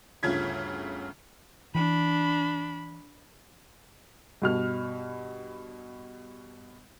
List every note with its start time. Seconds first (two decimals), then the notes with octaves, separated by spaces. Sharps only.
0.23 G1 D2 C#3 F4 G#6 B6
1.75 E3 D4 B5
4.42 G2 B2 F6